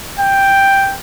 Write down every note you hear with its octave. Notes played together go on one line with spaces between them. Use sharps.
G5